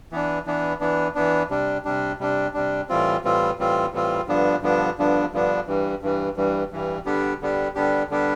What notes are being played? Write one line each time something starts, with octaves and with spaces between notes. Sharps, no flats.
E3 B3 D4
E3 B3 D4
E3 B3 D4
E3 B3 D4
C3 G3 D4
C3 G3 D4
C3 G3 D4
C3 G3 D4
A2 E3 G3 C4 F4
A2 E3 G3 C4 F4
A2 E3 G3 C4 F4
A2 E3 G3 C4 F4
G2 D3 F3 B3 D4
G2 D3 F3 B3 D4
G2 D3 F3 B3 D4
G2 D3 F3 B3 D4
G2 E3 G3
G2 E3 G3
G2 E3 G3
G2 E3 G3
D3 G3 B3 D4 G4
D3 G3 B3 D4 G4
D3 G3 B3 D4 G4
D3 G3 B3 D4 G4